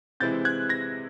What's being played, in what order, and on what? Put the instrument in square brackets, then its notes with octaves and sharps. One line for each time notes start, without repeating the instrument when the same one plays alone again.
[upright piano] C3 E3 G#3 C4 E4 [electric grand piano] G6 A6
[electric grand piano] F#6 G#6
G#6 A#6